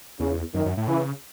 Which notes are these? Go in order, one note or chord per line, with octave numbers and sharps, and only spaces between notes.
E2 C#3
F#2 D#3
F#2
A2
C#3 E3